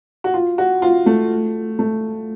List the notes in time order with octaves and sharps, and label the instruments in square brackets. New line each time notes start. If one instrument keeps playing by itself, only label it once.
[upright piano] F#4
F4
F#4
F4
A3
A3